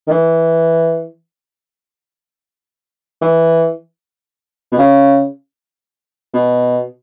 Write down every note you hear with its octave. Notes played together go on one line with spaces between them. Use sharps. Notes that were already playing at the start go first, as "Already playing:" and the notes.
D#3
E3
E3
B2
C#3
B2